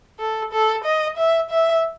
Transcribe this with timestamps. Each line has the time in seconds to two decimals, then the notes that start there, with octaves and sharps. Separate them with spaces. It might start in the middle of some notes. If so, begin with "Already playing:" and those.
0.19 A4
0.52 A4
0.84 D#5
1.17 E5
1.50 E5